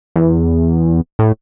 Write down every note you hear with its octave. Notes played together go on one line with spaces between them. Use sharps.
E2
A2